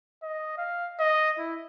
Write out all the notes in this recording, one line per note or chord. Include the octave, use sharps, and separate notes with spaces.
D#5
F5
D#5
E4